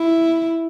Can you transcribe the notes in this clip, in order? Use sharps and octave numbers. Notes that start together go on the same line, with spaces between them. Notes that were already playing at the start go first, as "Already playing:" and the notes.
Already playing: E4